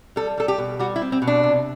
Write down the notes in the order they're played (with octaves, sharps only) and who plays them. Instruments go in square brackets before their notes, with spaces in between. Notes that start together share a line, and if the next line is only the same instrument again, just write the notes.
[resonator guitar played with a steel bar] G3 A4
G3 A4
G4
B2
G3 F#4
E4
C4
C4
B2
D4
C3